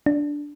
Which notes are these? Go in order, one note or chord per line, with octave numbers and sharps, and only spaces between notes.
D4